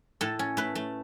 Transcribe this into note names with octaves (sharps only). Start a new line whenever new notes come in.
A2 A4
C#4
A3 B4
A3